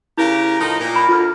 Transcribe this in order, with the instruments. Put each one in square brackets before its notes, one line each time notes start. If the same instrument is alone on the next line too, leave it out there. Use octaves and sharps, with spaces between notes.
[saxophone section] C#3 G4 A#4 [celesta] E4
[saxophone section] A2 F3 D#4
A#2 A#3
[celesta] B5
[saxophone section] D2 [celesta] F4 F6